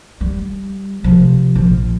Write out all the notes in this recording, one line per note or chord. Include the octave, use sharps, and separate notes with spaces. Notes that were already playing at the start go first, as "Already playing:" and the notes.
G3
C3 F3
A#1 F3